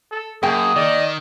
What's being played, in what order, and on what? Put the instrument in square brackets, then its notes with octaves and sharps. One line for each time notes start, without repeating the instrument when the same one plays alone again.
[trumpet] A4
[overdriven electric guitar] F#2 [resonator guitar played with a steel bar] A#3 G5 A5 [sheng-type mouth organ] G#4 [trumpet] D#6
[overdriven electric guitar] D#3 [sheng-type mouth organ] D5 D#5